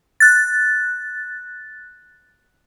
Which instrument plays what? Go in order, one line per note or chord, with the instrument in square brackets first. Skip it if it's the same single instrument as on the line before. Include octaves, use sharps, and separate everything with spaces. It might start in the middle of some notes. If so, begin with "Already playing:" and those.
[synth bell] F#6 A6